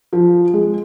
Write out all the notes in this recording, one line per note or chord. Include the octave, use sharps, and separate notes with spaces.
F3
G#3